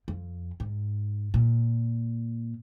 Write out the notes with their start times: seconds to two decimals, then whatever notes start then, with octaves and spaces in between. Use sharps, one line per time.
0.08 F2
0.60 G#2
1.34 A#2